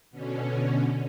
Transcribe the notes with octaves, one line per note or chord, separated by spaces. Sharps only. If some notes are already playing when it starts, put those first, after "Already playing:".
B2 D3 C#4